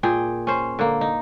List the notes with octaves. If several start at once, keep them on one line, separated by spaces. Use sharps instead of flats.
A#2 G#4 G5
C#4 C5
D3 A#3
D#4